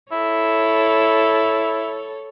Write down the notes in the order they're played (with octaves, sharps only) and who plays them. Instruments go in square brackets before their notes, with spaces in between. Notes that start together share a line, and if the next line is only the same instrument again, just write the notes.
[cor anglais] E4 [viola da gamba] A4 C#5